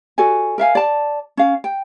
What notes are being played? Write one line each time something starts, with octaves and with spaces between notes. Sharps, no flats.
F#4 A4 D5 G#5
A#4 E5 F5 G#5
D5 A5
C#4 F5
G5